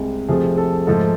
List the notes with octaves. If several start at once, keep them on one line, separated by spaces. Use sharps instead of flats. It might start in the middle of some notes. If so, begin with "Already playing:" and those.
Already playing: C2 C3 G#3
F2 C3 F3 A3 G#4
A4
G#2 F3 A3 A4